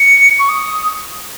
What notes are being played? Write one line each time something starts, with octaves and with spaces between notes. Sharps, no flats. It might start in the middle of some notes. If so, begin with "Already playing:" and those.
Already playing: C#7
C#6
D#6